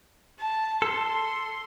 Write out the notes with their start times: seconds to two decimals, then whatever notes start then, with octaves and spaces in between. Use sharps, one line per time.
0.39 A5
0.82 A4 C6